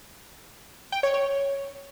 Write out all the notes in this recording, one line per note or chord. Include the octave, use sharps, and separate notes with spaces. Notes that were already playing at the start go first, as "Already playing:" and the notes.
G5
C#5
C#5